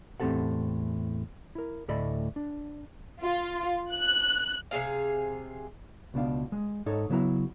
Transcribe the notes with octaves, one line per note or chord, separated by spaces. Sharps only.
E2 A2 C4 G4 A4 F#5
E4 A#4
D2 A2 A3 D5 D#5 B5
D4
F4
F#6
C3 B3 G#4 F5
C#2 B2 D4 F5
G#3
G#2 D#4 A4 C#5
C#3 F#3 B3 E4 A#5